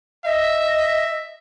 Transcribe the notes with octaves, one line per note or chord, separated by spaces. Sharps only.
D#5 E5